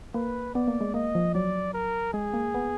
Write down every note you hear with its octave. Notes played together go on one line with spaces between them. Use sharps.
A#3 B4
B3 D5
A#3
G#3
A#3 D#5
F3
F#3 D5
A#4
G#3 G#4
A#3
B3